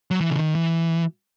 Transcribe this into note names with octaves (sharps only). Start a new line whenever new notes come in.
F#3
E3
C#3
D#3
E3